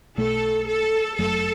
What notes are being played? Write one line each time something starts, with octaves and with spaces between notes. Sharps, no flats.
B1 B2 A3 A4
A4
G1 F#2 F#3 A3 A4